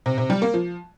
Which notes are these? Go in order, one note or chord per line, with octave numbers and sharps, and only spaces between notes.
C3
C3
G3
A#3
F3